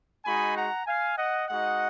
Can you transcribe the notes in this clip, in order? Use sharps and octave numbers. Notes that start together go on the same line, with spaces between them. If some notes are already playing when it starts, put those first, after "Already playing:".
G#3 D#4 F#4 G#5 B5
F#5 A#5
F5 G#5
D#5 F#5
G#3 D#4 F#4 D#5 F#5